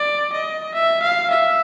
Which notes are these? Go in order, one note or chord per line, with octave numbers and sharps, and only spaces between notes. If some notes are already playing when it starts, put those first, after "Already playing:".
Already playing: D5
D#5
E5
F5
E5